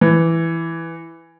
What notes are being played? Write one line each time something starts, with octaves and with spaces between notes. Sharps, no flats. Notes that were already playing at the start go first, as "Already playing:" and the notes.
E3